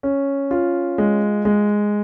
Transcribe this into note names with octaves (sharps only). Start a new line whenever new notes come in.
C#4
F4
G#3
G#3